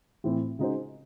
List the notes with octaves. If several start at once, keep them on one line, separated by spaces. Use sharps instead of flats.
A2 E3 C4
C#3 G#3 D#4 F#4 C5